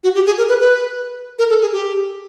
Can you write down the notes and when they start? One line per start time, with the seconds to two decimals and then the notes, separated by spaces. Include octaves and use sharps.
0.04 F#4
0.15 G4
0.26 G#4
0.38 A#4
0.49 B4
0.60 B4
1.39 A#4
1.50 A4
1.61 G#4
1.73 G4